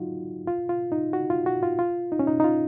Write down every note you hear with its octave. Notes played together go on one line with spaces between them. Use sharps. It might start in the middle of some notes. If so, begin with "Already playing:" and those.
Already playing: F#3 D#4 F4 F#4
F4
F4
D#4
F#4
F4
F#4
F4
F4
D#4
C#4
D#4
D#4
F4